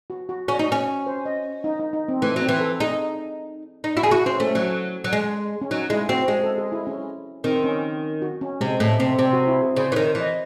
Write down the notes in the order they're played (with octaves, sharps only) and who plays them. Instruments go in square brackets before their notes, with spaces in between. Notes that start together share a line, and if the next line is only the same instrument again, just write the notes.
[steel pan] F#4
F#4
[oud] C#4 [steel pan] F#4
[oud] D#4
C#4
[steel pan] C5
D#5
D#4
D#4
D#4
C4
[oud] E3 [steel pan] A3
[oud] F#3
[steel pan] C4
[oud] E3
[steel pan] A4
[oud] D#4 [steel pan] G#4
[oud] D#4
[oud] E4 [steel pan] F#4
[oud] G#4
[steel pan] E4 [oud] F#4
[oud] C4 [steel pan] C#4
[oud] A3 [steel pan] C#4
[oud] F#3 [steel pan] C#4
[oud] F#3
G#3
[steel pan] C#4
[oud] F#3 [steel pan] D#4
[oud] G#3 [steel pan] E4
[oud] C4 [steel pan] F#4
[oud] G#3 [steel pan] G#4
[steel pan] A4
G#4
E4
C#4
[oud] D#3 [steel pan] C4
[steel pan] C#4
F#4
C#4
[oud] C3 [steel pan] G#3
[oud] A2 [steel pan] A3
[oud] C3 [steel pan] C4
[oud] C3 [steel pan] C4
[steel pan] F#4
E4
G#4
[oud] C#3 [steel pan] C5
[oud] E3 [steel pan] C#5
[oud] D#3
[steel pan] C5
[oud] E3
[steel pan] D#5